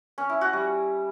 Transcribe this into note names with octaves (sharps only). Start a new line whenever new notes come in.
C#4
E4
F#4
G3